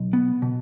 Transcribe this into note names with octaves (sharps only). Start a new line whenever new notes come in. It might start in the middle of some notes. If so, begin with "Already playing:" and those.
Already playing: B1
B3
B2